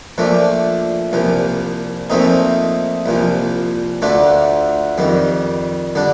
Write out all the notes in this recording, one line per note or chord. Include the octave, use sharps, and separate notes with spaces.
A#2 F3 A3 D4
C2 A#2 F3
A#2 F3 A3 C4 D#4
C2 A#2 F3
D2 D3 A3 D4 F4
F2 D#3 G3
D3 G3 D4